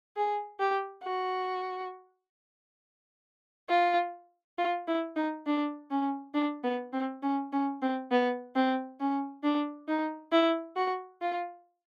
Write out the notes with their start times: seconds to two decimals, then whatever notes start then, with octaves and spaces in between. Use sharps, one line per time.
0.17 G#4
0.60 G4
1.04 F#4
3.69 F4
4.58 F4
4.88 E4
5.16 D#4
5.46 D4
5.91 C#4
6.34 D4
6.64 B3
6.93 C4
7.23 C#4
7.53 C#4
7.82 C4
8.11 B3
8.56 C4
9.00 C#4
9.43 D4
9.88 D#4
10.32 E4
10.76 F#4
11.21 F4